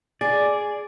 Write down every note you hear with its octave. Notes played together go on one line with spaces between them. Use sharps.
G#4 D5